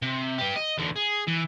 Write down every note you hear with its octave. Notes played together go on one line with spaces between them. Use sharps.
C3
G4 B4
D#5
E2 D3
G#4
E3